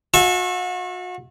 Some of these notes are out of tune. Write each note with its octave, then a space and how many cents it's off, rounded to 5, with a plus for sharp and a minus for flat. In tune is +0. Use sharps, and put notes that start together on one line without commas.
F#4 -40 E5 +0 G#5 +40